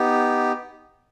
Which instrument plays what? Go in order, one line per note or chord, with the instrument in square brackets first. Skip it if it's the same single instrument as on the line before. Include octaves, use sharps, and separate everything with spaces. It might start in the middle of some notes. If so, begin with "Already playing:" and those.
Already playing: [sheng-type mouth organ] B3 D#4 G4